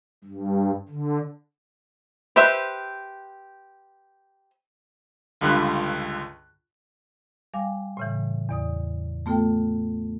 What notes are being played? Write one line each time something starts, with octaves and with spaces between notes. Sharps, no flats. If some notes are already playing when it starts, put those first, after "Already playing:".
G2
D3
G4 B4 C5 E5
C#2 G2 D3 F4 B5 F#6
G3 F5 G#5 D6
A2 C#3 E3
E2 D5 D#6
A3 B3 F4 A4 G5